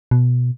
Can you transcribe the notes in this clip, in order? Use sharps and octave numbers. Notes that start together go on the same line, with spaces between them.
B2